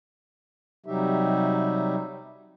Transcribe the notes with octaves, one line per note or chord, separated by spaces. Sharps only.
C3 F#3 G3 D#4 G4 E5